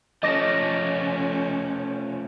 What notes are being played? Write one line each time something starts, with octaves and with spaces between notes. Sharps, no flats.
F3 A3 C#4 D#5 D6 A#6